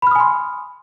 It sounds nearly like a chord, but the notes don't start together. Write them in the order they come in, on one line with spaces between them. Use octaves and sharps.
B5 F6 D#6 G#5 C6